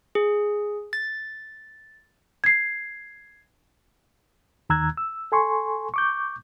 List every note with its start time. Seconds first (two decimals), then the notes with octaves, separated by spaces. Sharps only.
0.15 G#4
0.93 A6
2.44 G#6 C7
4.70 D#2 D#3 A#5 E6 F#6 G#6
4.97 E6
5.32 A4 G#5 C6 C#6
5.94 C#6 D6 G6